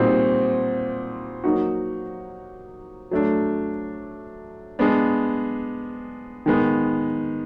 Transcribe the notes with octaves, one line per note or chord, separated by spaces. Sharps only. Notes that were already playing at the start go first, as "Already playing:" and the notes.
Already playing: A#2 G3 C4 D#4 F#4
F#3 A#3 D#4 F#4
F#3 A3 D4
G#3 B3 D4
D#3 G#3 B3